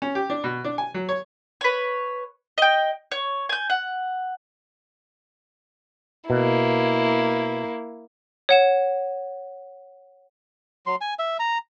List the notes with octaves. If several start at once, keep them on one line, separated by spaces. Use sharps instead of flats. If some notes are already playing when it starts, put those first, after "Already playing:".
C#4
G4
D4
B2
D4
G#5
F#3
C#5
B4 C#5
D#5 G5
C#5
G#5 G6
F#5
B2 A#3 E4
C#5 F#5 E7
F#3 C6
G#5
E5
A#5